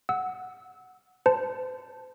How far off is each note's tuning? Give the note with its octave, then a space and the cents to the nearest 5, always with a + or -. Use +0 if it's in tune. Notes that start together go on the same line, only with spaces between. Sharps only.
F#5 +0 E6 -25
C5 -35 A5 +0